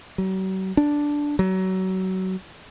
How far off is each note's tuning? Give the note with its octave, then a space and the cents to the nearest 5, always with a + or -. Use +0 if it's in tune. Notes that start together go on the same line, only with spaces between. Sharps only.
F#3 +40
D4 -5
F#3 +25